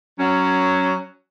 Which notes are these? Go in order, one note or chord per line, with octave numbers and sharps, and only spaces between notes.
F#3 C#4